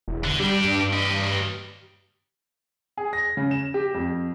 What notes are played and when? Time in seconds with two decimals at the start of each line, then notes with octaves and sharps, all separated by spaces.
0.08 E1
0.24 D3
0.39 G3 D4 G4
0.65 G2
0.93 G4 D#5
2.97 G#4
3.13 A#6
3.37 C#3
3.51 E7
3.74 G4
3.94 F2